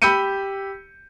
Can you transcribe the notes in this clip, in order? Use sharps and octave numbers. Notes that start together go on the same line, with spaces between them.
G4 B5 E6 G6 C#7 D#7